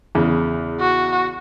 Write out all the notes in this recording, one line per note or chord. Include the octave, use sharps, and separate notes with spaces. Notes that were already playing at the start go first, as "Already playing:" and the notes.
E2 C#3
F#4